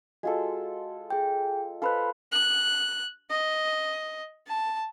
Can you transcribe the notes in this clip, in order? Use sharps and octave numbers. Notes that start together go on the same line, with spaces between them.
G#3 F4 F#4 A4
G#4 G5
A4 B4 C5 F5 B5 F#6
F#6
D#5
A5